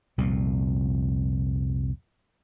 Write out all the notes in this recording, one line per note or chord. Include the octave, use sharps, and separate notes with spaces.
C2 F2 A#2